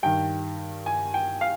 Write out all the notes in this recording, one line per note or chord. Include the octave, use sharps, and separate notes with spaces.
G2 D#3 G5
G#5
G5
F5